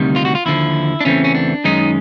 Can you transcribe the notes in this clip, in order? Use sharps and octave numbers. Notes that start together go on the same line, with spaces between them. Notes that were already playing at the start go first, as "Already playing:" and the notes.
Already playing: D2 C3 D#3 G3
F4
F#4
F4
D#2 D3 F3 E4
D4
E2 C#3 E3 A3 C4 C#4
C#4
D4
F#2 D#3 G#3 C#4 D#4